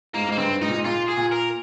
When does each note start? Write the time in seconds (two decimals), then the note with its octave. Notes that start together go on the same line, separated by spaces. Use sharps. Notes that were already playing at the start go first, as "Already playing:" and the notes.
0.14 G#2 A#3
0.28 G#2 A#3
0.38 G2 C4
0.61 G#2 D#4
0.68 A#2
0.76 G#2
0.85 A#2 F4
1.09 G#4
1.17 A#2
1.32 A#4